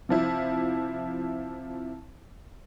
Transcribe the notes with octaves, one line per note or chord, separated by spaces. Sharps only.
C3 F3 E4